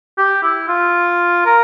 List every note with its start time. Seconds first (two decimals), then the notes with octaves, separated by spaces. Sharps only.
0.18 G4
0.43 E4
0.68 F4
1.46 A#4